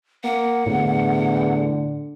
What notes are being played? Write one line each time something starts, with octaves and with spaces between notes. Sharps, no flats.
A#3 F#5
E2 A2 D3